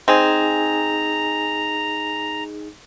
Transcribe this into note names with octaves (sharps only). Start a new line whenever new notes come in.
C4 D#4 G#4 G#5 A#5